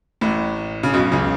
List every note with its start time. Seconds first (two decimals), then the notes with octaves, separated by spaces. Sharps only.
0.21 A1 A2
0.83 C#3
0.94 B1 B2
1.12 C#2 C#3